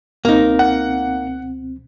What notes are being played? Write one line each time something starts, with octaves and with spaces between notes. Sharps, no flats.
C#2 B2 A#3 C4 D#4
F#5